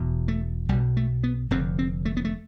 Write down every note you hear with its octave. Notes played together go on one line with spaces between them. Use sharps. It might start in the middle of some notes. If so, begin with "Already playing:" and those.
Already playing: E1 E2 B2
A3
B1 B2 G3
A3
B3
F1 F2 D3 C4
C4
A3
B3
A3